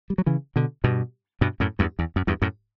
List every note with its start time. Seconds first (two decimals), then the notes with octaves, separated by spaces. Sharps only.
0.10 G3
0.18 F#3
0.26 C#3 E3
0.56 B2 D3
0.84 G2 B2
1.41 G2 B2
1.60 F#2 A2
1.79 E2 G2
1.99 E2
2.16 F#2
2.27 E2 G2
2.42 F#2 A2